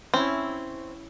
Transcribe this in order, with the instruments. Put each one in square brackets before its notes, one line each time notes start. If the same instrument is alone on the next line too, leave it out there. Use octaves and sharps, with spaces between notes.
[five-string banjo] C4 [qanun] C#4 E4